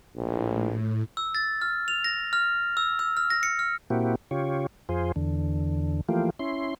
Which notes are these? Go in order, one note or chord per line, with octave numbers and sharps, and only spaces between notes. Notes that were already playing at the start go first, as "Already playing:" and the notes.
A#1 A2
E6
A6
F6
F7
A#6
F6
E6
E6
F6
A#6
C#7
F6
A#2 A#3 C4 E4 F#4 G4
C#3 F4 G4 C#5
F2 F4 G#4 C5
E2 D3
E3 F3 A3 A#3 F4 G4
C#4 E4 C6